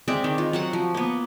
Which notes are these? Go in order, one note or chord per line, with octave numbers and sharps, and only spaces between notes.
G#3 C4 D5 E5
D#3 G#3
F4
F#3 C5 F#5
F3
A#3 B3